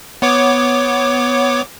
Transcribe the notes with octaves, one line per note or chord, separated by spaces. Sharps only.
B3 C#5 D6